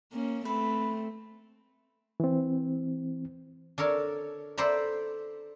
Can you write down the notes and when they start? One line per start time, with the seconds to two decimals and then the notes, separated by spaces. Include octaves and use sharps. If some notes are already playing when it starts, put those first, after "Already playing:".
0.13 A#3 C#4
0.45 A3 C4 B4
2.20 E3 C4
3.78 D4 A4 A#4 C#5
4.58 A4 C5 D5 A#5 B5